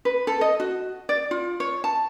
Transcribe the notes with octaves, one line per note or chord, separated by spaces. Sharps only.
B4
A4
D#5
F#4
D5
F4
C#5
A5